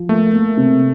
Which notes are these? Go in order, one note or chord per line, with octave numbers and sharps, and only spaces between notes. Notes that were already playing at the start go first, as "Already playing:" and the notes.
Already playing: F3
A3 A#3
A#3
C3